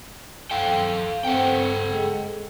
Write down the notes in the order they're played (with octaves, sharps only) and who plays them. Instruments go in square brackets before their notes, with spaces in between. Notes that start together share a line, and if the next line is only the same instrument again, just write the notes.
[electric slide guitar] A4 F5 G5
[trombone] C4 [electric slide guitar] A4 F#5 G5
[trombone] G#3